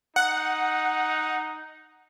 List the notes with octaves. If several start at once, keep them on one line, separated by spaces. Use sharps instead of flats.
D#4 F#5